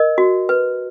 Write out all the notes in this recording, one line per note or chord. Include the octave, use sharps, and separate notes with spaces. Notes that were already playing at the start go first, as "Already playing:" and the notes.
Already playing: A#4 D#5
F#4
B4